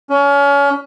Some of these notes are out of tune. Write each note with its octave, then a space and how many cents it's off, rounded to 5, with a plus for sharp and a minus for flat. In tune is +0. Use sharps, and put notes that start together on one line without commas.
C#4 +30